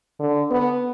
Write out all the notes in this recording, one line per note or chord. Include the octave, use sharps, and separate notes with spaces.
D3
B3